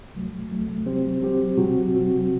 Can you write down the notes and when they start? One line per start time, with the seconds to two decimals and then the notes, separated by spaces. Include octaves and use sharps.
0.14 D2 C3 F#3 A3
0.50 D2 C3 F#3 A3
0.85 F#3 C4 G4 C5
1.21 F#3 C4 G4 C5
1.58 C3 F#3 C4 F#4
1.94 C3 F#3 C4 F#4